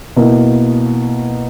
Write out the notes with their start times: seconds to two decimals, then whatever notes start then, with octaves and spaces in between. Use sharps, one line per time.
0.16 B2 A#3 E4